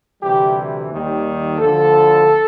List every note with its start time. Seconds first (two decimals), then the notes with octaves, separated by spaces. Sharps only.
0.22 D2 C3 E3 G3 G4
0.90 D#2 D#3 G3
1.58 D2 D3 F3 A4